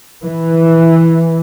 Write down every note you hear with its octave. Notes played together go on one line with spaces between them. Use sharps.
E3